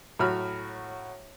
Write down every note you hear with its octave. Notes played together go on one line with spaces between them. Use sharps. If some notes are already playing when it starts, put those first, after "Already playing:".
A2 F#3 F#4 B5 F6